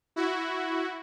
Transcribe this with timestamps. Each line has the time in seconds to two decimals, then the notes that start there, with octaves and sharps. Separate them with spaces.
0.16 E4 F#4